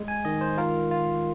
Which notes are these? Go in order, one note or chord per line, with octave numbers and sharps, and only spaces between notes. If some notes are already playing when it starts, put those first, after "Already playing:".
Already playing: G#3
G#5
D#3 D#5
C5
F4 A#4
F4